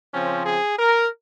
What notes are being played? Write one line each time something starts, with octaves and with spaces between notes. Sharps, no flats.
C#3 F3 C4 C#4
G#4
A#4